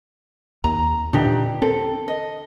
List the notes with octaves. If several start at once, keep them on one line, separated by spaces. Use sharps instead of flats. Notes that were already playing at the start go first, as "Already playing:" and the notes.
D#2 A#5
A#2 D3 E3 D4 D#4 G4
C4 A4
D#5